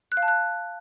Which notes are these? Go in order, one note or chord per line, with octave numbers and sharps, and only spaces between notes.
F#6
F5
A5
F#6